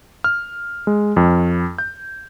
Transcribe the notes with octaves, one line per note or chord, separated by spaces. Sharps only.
F6
G#3
F2
G6